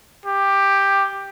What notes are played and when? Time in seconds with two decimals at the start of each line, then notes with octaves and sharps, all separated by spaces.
0.26 G4